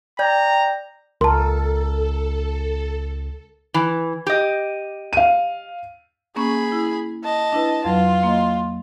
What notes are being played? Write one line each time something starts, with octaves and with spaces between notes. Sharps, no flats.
D5 G5 A#5 G6
C#2 A4 A#4 A5 C6
E3
G4 D#5
F5 D#7
A#3 C#4 G#4 B5 C#6
E4
D#5 A5
D4 E4 B4
F2 F#3 F4 B4
A#3 D#5